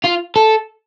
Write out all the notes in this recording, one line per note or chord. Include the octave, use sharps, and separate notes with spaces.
F4
A4